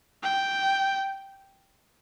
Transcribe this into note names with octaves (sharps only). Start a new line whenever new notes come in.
G5